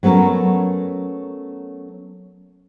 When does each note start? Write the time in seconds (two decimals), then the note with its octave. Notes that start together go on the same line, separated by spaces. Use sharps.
0.03 F#3 A3 B3 C#4 A#4